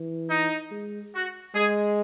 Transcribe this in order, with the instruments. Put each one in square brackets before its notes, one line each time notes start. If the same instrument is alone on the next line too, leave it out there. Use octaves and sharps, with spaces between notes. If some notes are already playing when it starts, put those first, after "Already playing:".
Already playing: [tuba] E3
[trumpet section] D#4
[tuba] G#3
[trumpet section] F#4
[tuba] G#3 [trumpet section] G#4